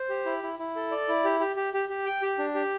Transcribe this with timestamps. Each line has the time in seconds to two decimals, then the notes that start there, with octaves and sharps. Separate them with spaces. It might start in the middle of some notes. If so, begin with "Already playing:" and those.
Already playing: C5
0.09 G4
0.26 E4
0.43 E4
0.59 E4
0.76 A4
0.91 D5
1.08 E4
1.25 G4
1.40 G4
1.56 G4
1.74 G4
1.89 G4
2.06 G5
2.22 G4
2.39 D4
2.55 G4